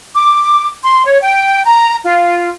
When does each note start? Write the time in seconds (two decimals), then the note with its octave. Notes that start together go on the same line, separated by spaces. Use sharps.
0.14 D6
0.84 C6
1.05 C#5
1.21 G5
1.64 A#5
2.03 F4